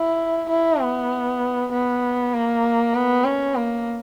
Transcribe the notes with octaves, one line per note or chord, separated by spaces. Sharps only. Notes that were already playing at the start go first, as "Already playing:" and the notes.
Already playing: E4
E4
B3
B3
A#3
B3
C#4
A#3